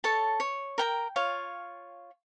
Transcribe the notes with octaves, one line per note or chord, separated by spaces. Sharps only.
A4 C#5 A5
C#5
A#4 G5 A#5
F4 C#5 F5